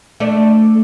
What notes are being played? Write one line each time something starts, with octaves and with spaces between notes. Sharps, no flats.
A3 D4